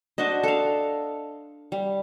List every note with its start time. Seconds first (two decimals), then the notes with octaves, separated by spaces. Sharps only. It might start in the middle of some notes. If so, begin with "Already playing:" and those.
0.18 D4 F#4 C5 D#5
0.43 A4 F5
1.72 G3